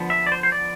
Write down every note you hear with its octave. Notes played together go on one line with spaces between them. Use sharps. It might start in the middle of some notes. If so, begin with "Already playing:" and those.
Already playing: D3 F3 B3
E5
D5
C5
C5
D5